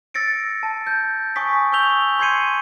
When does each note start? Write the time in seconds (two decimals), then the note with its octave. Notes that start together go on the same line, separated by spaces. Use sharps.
0.14 E6 A6 A#6 C#7 D7
0.63 A5
0.87 G6
1.36 G#5 C#6 D#6 B6
1.72 C#6 D#6 E6 G6 F7 G7
2.19 C6 G6 G#6 C7 C#7 D#7